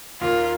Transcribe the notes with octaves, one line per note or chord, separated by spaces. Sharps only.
D#2 D#3 A#3 F4